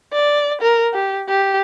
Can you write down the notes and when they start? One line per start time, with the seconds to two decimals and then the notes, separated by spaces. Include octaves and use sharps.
0.13 D5
0.61 A#4
0.94 G4
1.29 G4